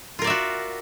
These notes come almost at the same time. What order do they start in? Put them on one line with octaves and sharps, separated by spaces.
F4 A#4 D5 E5 F#4